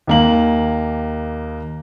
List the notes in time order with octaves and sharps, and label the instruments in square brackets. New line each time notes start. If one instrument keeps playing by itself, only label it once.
[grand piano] D#2 A#3 F#7